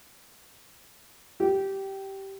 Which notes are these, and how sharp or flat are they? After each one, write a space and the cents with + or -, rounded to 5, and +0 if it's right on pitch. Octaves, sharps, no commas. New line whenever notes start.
G4 -15